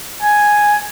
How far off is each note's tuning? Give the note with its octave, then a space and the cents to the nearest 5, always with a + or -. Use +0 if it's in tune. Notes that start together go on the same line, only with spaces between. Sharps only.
G#5 +0